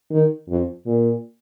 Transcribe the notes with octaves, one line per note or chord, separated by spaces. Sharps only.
D#3
F2
A#2